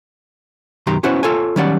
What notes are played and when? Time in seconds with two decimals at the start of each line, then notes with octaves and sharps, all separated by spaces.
0.87 B1 F#2 D#3 G4 A#5 C6
1.03 B3 C#4 E4 F#4 C5 F#5
1.23 F4 A4 C#5 G#5
1.56 D#3 F#3 G3 C#4 D5 F#5